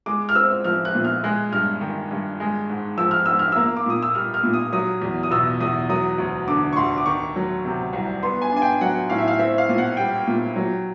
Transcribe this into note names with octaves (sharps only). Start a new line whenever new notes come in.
G#3 D6
F6
C4 E6
F3 F6
F#6
A#2
F6
G#3 F#6
G2 F6
D#3
G2
G#3
G#2
F3 E6
F6
G#2 E6
F6
A#3 E6
D6
A#2 D#6
E6
G3 F6
F6
A#2
D#6
F#3 D#6
E2
D#6
B2 E6
E2 D#6
F#3 D#6
D2
D3 D6
C#6
D2 C6
D6
D#3 C#6
F#3
C3
C2
B3 C6
G#5
D4 G#5
G5
F#3 F#5
A2 F5
E5
F5
C4 E5
F5
A#2
F#5
G3 G5
A#2
F#3